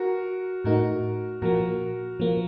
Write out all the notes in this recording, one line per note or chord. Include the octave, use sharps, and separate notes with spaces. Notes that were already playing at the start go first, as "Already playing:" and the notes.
Already playing: F#4 A#4
A2 A3 D#4 F#4 A#4
A#2 F3 A#3 F#4 A#4
A#2 F3 A#3